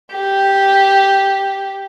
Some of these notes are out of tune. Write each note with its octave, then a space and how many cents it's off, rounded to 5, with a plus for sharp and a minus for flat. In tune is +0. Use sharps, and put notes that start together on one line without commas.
G4 +0